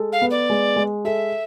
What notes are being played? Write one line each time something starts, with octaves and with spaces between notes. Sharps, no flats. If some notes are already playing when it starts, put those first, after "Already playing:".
Already playing: G#3 A4
F5
B3
D5
G#3
G#3
A4 E5